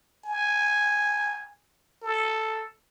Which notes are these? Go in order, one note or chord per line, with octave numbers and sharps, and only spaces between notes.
G#5
A4